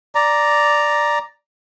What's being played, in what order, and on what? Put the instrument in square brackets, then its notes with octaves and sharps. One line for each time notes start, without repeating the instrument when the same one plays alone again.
[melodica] D5 A#5